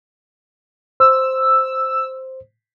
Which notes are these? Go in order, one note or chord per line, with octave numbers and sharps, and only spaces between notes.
C5 E6